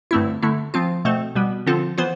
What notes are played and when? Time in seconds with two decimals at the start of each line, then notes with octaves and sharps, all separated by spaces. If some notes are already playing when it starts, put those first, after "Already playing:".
0.11 G2 D3 A3 C4 E4
0.43 D3 A3 E4
0.74 F3 C4 F4
1.05 B2 A3 C4
1.35 B2 G3 B3
1.66 D3 F3 C4 F4 A4
1.98 E3 B3 F4 C5